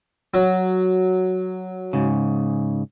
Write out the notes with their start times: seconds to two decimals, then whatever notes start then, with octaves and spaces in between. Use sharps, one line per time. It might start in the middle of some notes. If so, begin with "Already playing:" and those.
0.34 F#3
1.93 G#2 C#3